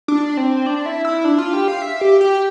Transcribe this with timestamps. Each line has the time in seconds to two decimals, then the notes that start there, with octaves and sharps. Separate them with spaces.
0.08 D4
0.37 C4
0.66 D4
0.86 E4
1.05 E4
1.25 D4
1.39 F4
1.53 G4
1.68 F5
1.82 E5
2.01 G4
2.21 G4